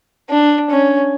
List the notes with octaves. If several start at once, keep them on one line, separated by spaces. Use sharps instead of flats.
D4
C#4